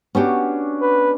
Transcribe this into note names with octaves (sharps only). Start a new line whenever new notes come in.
B3 C#4 D4 F#4 G4
B4